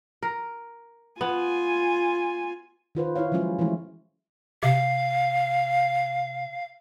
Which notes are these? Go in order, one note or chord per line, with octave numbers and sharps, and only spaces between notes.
A#4
B3 F4 G#5
D#3 F4 B4 C5
E4 F4 C#5 F5
F3 F#3 G#3 C#4 F4
E3 F3 G#3 A3 E4
C3 F5